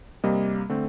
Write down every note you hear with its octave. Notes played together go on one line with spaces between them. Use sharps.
C3 G3 A#3 D#5
D3 A3 C4